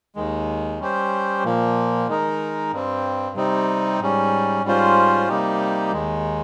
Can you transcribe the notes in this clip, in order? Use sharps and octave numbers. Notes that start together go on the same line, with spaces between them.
D#2 D#3 G#3
G3 C#4 G4 C5
A#2 F3 A#3
D#3 G#3 D#4 A#4
G2 G3 C4
C3 G3 C4 D#4
G#2 G3 C#4
G#2 G3 C#4 F4 C5
C3 G3 A#3 D#4 G4
D#2 D#3 G#3